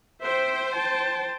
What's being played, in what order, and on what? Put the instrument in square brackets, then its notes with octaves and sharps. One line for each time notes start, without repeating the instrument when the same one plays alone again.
[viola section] C5 [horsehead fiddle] E5 G5
[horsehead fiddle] G5 A5